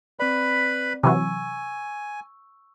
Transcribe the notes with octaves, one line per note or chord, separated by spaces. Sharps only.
C4 B4 D5 B5
C3 E3 F#3 G#5 C#6 E6